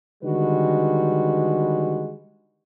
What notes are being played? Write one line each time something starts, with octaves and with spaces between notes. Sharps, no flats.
D3 D#3 G3 G#3 F#4 B4